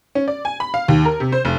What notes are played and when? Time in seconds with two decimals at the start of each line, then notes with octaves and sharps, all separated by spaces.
0.15 C#4
0.28 D5
0.45 G#5
0.60 B5
0.74 F5
0.88 D#2
1.05 A#4
1.20 C3
1.32 C5
1.45 F1